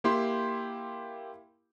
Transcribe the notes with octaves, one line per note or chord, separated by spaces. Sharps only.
A#3 E4 G4 G5 C6